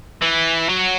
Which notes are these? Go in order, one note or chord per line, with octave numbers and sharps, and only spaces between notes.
E3
F#3